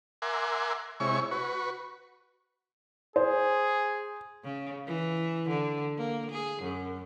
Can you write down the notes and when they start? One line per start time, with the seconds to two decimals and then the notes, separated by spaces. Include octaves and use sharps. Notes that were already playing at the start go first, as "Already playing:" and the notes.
0.22 A#4 E5 F#5 G#5 C6 D6
1.00 C3 G#3 E4 C#5 C#6
1.31 F#4 B4 C#6
3.16 G#4 C5
4.44 C#3
4.87 E3
5.49 D3
5.98 A#3
6.31 G#4
6.62 F#2